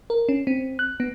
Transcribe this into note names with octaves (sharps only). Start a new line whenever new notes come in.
A#4
C#4
C4
F#6
B3